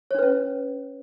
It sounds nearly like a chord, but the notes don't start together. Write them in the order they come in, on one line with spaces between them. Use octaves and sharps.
C#5 D4 B4 C#4